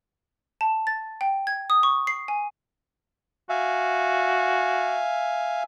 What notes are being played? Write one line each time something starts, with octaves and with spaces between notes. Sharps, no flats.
A5
A6
G5
G#6
D#6
C#6
C7
G#5
F#4 E5 F5 G#5